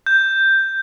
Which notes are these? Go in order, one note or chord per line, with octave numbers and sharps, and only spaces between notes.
G6